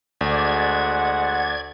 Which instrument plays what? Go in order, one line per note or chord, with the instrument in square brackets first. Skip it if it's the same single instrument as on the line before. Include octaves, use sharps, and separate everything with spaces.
[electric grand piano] D2 [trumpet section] G#3 F#5 [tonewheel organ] D5 G#6